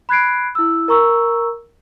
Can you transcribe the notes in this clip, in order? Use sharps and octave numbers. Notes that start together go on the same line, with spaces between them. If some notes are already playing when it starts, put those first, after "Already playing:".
B5 F#6 G#6 C7 D7
E4 E6
A#4 A#5 C#6 E6